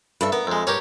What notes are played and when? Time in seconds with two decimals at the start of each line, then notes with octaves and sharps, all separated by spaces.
0.21 G2 A4 E5
0.32 B3 A#4
0.47 F2 G#3
0.67 G2 G4 A#4 C#5